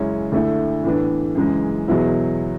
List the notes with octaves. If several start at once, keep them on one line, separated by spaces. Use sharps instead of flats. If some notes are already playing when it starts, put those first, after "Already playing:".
Already playing: F#2 C#3 G#3 C#4 E4
D2 D3 A3 E4
A2 E3 B3 D4
F#2 C#3 E3 G#3
E2 B2 F#3 B3 E4